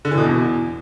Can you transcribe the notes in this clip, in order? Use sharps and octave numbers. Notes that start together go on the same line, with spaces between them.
D3
E3
B2
E2